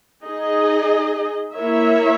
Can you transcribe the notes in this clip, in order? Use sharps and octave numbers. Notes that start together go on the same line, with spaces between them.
D#4 G#4 D#5
A#3 E4 A#4 C#5 E5